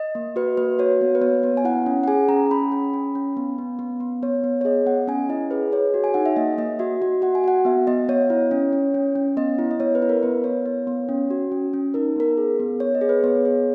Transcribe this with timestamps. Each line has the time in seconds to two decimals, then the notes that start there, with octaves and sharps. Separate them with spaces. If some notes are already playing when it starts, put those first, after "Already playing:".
Already playing: D#5
0.15 A#3
0.36 F#4 B4
0.57 A#3 B4
0.79 F#4 C#5
1.01 B3
1.15 B4
1.21 B3 C#5
1.43 B3
1.57 G#5
1.65 E4 F#5
1.86 C#4
2.04 F#5
2.08 G#4 G#5
2.29 C#4 A#5
2.51 C#4 B5
2.72 C#4
2.94 C#4
3.15 C#4
3.37 B3
3.58 B3
3.79 B3
4.00 B3
4.23 B3 C#5
4.44 B3
4.61 C#5
4.65 G#4 D#5
4.86 B3 F#5
5.07 C#4 G#5
5.29 E4 D#5
5.51 G#4 B4
5.72 G#4 C#5
5.94 F#4
6.04 G#5
6.14 D#4 F#5
6.26 E5
6.36 A#3 D#5
6.58 A#3 D#5
6.79 F#4 E5
7.02 F#4
7.22 F#4 F#5
7.35 G#5
7.44 F#4 F#5
7.65 B3 E5
7.87 B3 D#5
8.08 B3 C#5
8.30 E4
8.51 C#4
8.73 C#4
8.94 C#4
9.16 C#4
9.37 B3 D#5
9.59 E4
9.71 D#5
9.80 B3 C#5
9.95 B4
10.02 E4
10.09 A#4
10.23 B3 B4
10.44 B3 C#5
10.66 B3
10.87 B3
11.09 C#4
11.30 F#4
11.52 C#4
11.73 C#4
11.94 D#4 A#4
12.16 B3 A#4
12.37 G#4
12.60 B3
12.80 B3 C#5
12.95 D#5
13.01 G#4
13.09 B4
13.23 B3 C#5
13.45 G#4